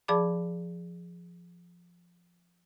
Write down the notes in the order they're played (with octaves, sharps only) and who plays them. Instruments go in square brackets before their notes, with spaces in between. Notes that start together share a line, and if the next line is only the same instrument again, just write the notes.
[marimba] F3 G#4 D5 A5 B5 D6